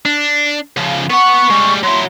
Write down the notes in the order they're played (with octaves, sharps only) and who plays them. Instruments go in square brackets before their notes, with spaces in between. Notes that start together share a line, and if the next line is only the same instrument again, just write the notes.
[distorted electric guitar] D4
C#3 F3
[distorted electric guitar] B3 F#5 [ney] C#6
[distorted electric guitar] G3 G#3
[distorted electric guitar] F#3 E4 [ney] C6